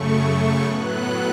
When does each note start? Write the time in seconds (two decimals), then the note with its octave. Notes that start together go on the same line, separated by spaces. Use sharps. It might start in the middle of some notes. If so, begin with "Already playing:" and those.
Already playing: F#2 C#3 A3 C#6
0.17 C#6
0.64 A2 F#3 B3 F#6